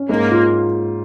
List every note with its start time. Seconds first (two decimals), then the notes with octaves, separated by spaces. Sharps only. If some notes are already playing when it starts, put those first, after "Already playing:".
Already playing: C#4
0.09 G#2 A#3
0.31 F4